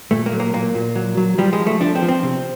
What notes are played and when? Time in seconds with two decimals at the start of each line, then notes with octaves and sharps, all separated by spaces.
0.11 A#2 A3
0.26 A#3
0.32 F#3
0.40 A#3
0.53 A#2 A#3
0.75 A#2
0.96 F#3
1.17 F#3
1.38 F3 G3
1.53 G#3
1.60 F3
1.67 A3
1.81 F3 D4
1.95 C4
2.02 F3
2.09 C4
2.23 C3